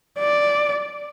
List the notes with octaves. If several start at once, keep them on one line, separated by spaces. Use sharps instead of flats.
D5